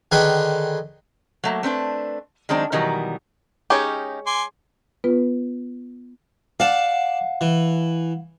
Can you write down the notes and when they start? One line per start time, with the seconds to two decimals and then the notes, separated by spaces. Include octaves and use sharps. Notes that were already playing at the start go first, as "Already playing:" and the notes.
0.11 D3 D#3 G#4 B4 D#5 G5
1.44 F#3 A3 A#3
1.63 A3 C4 D4 B4
2.49 D#3 F#3 G#3 C4 D4
2.72 B2 D#3 E3 F#3 G3 A#4
3.70 G#3 C#4 D#4 G4 C#5
4.26 G#5 C6 D6
5.04 B3 F4 B4
6.60 D5 F5 F#5 A5
7.41 E3